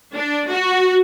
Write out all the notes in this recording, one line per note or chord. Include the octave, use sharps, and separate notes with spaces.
D4
F#4